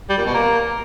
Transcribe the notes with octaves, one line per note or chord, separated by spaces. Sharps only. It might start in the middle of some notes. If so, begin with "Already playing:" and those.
G3
A#2
B2
A#3